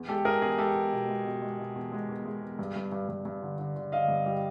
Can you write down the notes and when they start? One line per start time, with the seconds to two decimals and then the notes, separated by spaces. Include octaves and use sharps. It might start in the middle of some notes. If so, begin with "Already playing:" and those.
Already playing: E2
0.08 G#3 G4 A4
0.25 G#3 G#4 A#4
0.42 E2 G#4
0.58 G#3 G4 A4
0.75 E2
0.92 B2
1.08 G#3
1.25 B2
1.42 G#3
1.59 B2
1.75 E2
1.92 G#3
2.09 E2
2.26 G#3
2.42 E2
2.59 G2
2.76 G2
2.92 G2
3.09 G2
3.25 G2
3.42 D3
3.59 D3
3.76 D3
3.92 D3 D#5 F5
4.08 G2
4.26 G3